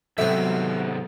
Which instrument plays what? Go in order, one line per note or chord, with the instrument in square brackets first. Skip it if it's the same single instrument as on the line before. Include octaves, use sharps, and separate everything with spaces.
[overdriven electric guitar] G#2 B3 [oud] C3 D#3 F#3 [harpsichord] C4 E5 [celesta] A4